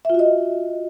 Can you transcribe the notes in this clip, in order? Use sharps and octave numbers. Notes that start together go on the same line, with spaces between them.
F4 F#4 D#5 E5